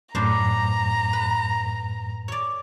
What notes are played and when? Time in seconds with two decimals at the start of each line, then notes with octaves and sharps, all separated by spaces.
0.15 F#2 A2 B3 D4 C5 A#5
1.13 B4
2.28 C#5 D5